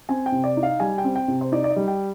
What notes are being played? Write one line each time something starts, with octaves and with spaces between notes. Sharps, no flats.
C4 G#5
G5
C3
D5
D#4
F5
G3 G#5
G5
C4
G5
C3
C5
D#4 D5
D5
D#5
G3
G5